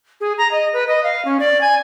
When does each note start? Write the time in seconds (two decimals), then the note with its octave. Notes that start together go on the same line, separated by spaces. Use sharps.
0.21 G#4
0.38 A#5
0.52 D#5
0.73 B4
0.88 D#5
1.04 F5
1.25 C#4
1.40 D5
1.61 G#5